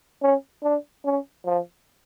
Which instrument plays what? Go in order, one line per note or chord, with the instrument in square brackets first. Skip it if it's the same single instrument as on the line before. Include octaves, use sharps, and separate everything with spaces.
[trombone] C#4
D4
C#4
F3